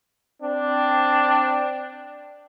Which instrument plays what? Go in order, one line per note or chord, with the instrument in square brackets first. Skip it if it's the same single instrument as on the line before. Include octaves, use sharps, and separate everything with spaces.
[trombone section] C4 D4